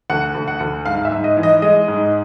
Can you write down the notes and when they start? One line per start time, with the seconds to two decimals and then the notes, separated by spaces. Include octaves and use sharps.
0.10 D2 F#5
0.35 D2
0.48 F#5
0.60 D2
0.85 G#2 F5
1.05 E5
1.11 G#2
1.24 D#5
1.37 E3
1.43 D#5
1.62 G#3 D#5
1.88 G#2